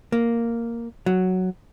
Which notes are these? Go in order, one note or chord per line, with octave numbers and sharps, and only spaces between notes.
A#3
F#3